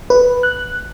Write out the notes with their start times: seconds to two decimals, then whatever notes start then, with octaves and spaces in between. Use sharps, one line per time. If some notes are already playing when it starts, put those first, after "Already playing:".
0.10 B4
0.43 F#6